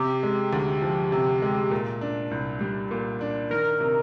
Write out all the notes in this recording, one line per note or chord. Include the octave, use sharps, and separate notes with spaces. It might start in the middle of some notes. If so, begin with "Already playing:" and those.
Already playing: C3 G4
G#3
D2
F3
C3
G#3
A#2
D4
C2
G3
A#2
D4
D#3 A#4
C3